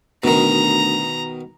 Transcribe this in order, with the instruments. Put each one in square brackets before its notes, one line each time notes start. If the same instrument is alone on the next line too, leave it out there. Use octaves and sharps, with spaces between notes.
[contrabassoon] D2 [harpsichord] B2 D#3 [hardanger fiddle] A#5